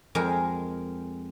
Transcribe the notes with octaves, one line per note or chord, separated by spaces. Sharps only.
F2 G#3 G#4 A#4